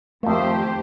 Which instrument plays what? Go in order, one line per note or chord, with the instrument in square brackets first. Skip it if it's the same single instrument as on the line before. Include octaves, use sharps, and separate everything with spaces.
[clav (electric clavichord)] F2 A#3 [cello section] D#3 G4 C5 [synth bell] A3